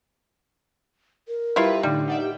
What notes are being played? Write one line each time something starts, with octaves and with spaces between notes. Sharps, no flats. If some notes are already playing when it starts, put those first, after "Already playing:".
A#4
G3 E4 F4 B4 A#5
A2 D3 G3 D#4
D#4 D5 E5 F#5
G4 G5